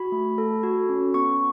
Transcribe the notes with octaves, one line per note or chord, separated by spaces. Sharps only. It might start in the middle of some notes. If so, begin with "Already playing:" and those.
Already playing: F#4 B5
A3
A4
F#4
C#4
B3 C#6